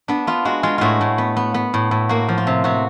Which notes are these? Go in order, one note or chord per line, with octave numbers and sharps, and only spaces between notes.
B3 D4
B3 F4
G#3 F#4
G#3 F4
A2 F4 F#4
A2
B3
B3
B3
A2
A2
A#3 F#4
F3
F4
C3
C3 F#4